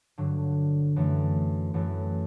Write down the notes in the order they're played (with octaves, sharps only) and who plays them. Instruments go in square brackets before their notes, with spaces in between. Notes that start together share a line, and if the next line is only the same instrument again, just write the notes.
[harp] G2 D3 F#3
F#2 E3 A3
F#2 E3 A3